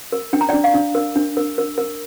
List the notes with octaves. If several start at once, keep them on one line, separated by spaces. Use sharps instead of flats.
A#4
D4 G5
A#5
D5 G5
D4
F5
D4
A#4
D4
A#4
A#4
A#4